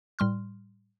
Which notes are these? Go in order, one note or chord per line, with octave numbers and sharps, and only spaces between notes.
A2 G3 C6 F6